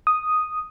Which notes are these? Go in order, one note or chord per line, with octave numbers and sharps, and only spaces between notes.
D#6